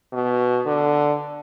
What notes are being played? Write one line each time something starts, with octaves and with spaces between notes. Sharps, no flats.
B2
D3